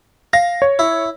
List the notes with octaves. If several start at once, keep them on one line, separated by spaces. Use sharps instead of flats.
F5 A#6
C#5
E4